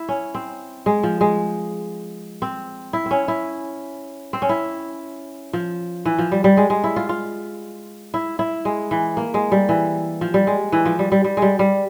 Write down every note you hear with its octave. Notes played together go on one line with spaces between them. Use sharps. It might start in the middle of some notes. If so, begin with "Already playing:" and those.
Already playing: E4
C#4
C4
G#3
F3
G#3
C4
E4
C4 C#4
E4
C4
C#4
E4
F3
E3
F3
G3
G3
G#3
G#3
E4
F4
F4
E4
E4
G#3
E3
A#3
G#3
G3
E3
F3
G3
G#3
E3
F3
G3
G3
G3
G#3
G3
G3